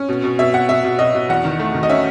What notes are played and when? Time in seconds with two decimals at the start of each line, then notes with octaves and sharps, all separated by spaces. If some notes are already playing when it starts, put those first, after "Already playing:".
Already playing: C#4
0.09 B2
0.23 B2
0.39 B2 E5
0.54 B2 F#5
0.69 B2 E5
0.84 B2
0.99 B2 D#5
1.14 B2
1.29 E2 F#5
1.45 D#3
1.59 A3
1.75 D#3
1.83 D#5
1.89 C#4 E5